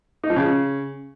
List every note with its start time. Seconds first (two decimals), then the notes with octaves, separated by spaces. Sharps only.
0.24 D#4
0.30 F3
0.36 C#3